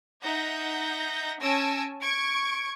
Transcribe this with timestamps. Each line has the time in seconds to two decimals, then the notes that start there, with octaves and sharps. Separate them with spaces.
0.23 D#4 E5 F#5 G6 A#6
1.41 C#4 G#5 A5 E6 A#6 D7
2.01 C#6 G#6 D7